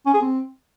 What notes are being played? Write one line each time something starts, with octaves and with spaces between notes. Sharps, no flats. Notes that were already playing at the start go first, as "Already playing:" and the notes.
C#4
G#4
C4